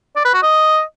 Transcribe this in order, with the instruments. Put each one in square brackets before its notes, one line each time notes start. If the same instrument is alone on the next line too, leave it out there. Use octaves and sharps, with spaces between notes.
[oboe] D5
B4
F#4
D#5